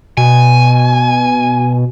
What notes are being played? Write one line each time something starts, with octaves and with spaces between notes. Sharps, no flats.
B2 G#5